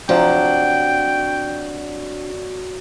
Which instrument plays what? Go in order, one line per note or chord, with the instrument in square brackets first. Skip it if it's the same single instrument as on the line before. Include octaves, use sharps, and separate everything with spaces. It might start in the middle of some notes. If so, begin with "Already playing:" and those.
[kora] C3 F3 [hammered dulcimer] F#3 [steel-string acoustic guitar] D4 [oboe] G5